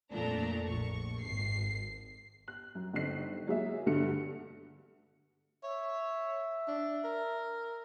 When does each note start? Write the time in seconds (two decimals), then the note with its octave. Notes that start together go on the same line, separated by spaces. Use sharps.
0.12 F2 A#2 A3 D4 A#5
0.66 A#1 C#6
1.22 G#1 C7
2.48 F#6
2.75 F#2
2.93 G1 D3 C4 D#4 F#6 C7
3.47 F#3 G#3 A#3 G#4 D#5 E5
3.87 G2 B2 D3 D4 A4 C#7
5.63 C#5 E5
6.68 D4
7.05 A#4